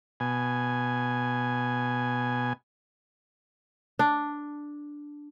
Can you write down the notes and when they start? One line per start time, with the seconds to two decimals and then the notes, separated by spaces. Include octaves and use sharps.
0.20 B2 G#5
3.99 D4